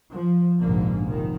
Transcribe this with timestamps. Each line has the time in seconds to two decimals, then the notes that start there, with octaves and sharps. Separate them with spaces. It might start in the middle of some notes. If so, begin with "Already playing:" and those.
0.10 F3
0.60 F1 A#1 G#2 D3 A#3
1.04 F1 D#3